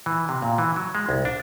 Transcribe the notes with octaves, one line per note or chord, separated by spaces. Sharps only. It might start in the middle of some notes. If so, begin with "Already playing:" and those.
E3
C3
A#2
E3
F#3
G#3
C2
D4